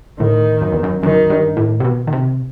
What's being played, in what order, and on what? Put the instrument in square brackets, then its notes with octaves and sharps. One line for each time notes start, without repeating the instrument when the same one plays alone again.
[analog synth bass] A2 [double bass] D#3
[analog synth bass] F#2
E2
F#2
[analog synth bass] F#2 [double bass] D#3
[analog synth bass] G2
A2
C3
B2
D#3
C3